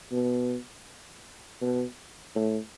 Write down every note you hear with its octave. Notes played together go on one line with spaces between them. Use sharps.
B2
B2
A2